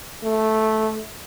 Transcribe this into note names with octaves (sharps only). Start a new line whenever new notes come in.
A3